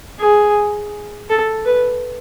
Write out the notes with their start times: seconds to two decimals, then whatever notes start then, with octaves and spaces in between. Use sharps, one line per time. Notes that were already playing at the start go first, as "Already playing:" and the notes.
0.20 G#4
1.30 A4
1.65 B4